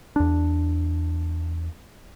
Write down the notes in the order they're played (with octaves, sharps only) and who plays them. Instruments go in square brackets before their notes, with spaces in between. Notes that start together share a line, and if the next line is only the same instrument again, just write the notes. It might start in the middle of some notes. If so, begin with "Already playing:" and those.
[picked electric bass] E2 D4